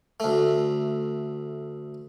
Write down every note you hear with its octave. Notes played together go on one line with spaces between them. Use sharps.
D2 A3